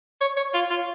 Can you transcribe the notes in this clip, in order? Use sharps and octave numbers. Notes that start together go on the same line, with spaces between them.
C#5
C#5
F4
F4